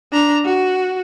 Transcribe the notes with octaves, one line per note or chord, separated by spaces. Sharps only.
D4 A#5
F#4